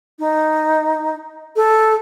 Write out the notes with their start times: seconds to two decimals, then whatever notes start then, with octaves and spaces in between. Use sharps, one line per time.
0.19 D#4
1.56 A4